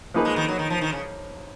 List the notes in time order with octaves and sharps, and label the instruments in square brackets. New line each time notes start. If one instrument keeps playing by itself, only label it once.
[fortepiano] F3 A#3 D#4 G#4 B4
[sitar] G#3
D#3
F#3
D#3
F3
D#3
C#3